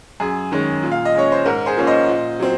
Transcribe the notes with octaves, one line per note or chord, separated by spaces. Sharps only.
F#2 G#4
D#3 G#3 C#4
A#2
F5
D#5
G#3 C#4 C#5
C5
G#2 A#4
G#4 C5
F3 A#3 C#4
C5 D#5
A#2
F#3 C4